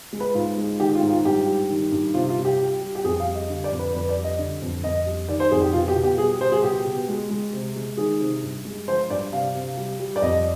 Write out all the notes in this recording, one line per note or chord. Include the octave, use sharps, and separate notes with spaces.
G#3
B4
G#2 F4
G#3
D#3 G4
F4
G#2
F4
G2 G4
G3
D#3
G2
C3 F4
F4
C3
G4
G3
G3
G4
F2 G#4
F5
G3
D#5
D3
D5
F2
B4
F2 B4
D5
G3
D#5
D3
F2
F2 D#5
G3
D#3 D5
C5
F2 G#4
G4
B2 F4
G4
B2
G4
G3 G#4
G3 C5
G#4
B2 G4
B2
G#3
G#3
C3
G#3
D#3 G#4
C3
G2
G#3
F3 C5
G2 D5
C3 F5
C3
G3
G3
D5
F2 D#5